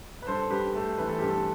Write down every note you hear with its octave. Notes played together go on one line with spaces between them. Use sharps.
B4
G2 A4 C5
G2 G4 B4
A3
E3 B4
A4
G2 G4
A4